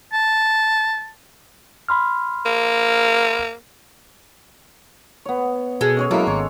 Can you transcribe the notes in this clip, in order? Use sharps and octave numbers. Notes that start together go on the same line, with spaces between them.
A5
B5 C6 F6
A#3
B3 C#5
B2 G#3 A4
C#4 G#4 C#5
F#3 G#3 A#3 E4 A4 A#4
G#1 C#5